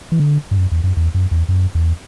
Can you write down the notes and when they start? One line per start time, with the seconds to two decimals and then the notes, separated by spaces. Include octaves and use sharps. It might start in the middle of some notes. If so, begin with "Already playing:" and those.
0.12 E3
0.20 D3
0.51 G2
0.58 F#2
0.72 E2
0.84 F#2
0.97 E2
1.14 F#2
1.31 E2
1.49 F#2
1.75 E2